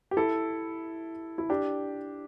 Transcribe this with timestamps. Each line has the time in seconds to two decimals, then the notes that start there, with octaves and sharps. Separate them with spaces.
0.11 G4
0.17 E4 A4
1.38 E4
1.49 D4 G4